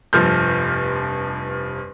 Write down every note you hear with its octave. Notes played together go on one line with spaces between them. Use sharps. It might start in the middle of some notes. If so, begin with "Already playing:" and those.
F1 G2 F3 F6 G6